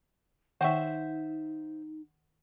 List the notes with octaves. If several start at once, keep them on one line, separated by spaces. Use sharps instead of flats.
D#3 D#4 C5 E5 F#5 G5 C#6